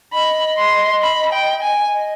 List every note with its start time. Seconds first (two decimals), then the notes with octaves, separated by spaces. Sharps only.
0.13 D#5 B5
0.57 C6
1.03 B5
1.33 G5
1.62 G#5
1.92 D#5